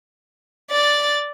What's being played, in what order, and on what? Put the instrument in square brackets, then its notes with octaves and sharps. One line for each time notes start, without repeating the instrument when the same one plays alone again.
[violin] D5 A6